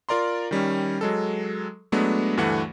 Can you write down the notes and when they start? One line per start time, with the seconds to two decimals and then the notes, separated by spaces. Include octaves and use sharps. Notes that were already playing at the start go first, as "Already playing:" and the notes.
0.09 F4 A#4 D5 A#5 C6
0.51 D#3 G3 C#4
1.01 F#3 G#3 A4
1.92 F#3 G#3 A3 B3 D4
2.37 D2 G2 E3 A3 F#5